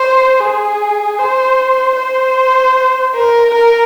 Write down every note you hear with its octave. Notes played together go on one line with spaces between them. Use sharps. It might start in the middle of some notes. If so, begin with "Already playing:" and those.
Already playing: C5
G#4
C5
C5
A#4
A#4